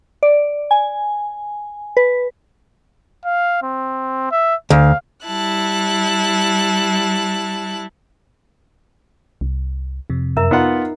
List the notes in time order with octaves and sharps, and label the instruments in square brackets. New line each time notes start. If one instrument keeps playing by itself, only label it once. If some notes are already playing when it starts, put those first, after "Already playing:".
[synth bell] D5
G#5
B4
[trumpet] F5
C4
E5
[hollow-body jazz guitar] D2 [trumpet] F5
[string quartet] G3 E4 A5 F#6
[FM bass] C2
[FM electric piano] F2 C3
[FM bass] F#2 [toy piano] A#4 E5 A#5
[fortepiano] B3 F4 F#5 [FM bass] D#4